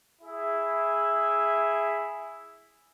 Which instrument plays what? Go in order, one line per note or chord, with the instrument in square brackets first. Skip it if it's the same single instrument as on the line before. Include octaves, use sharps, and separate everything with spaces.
[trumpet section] E4 G#4 E5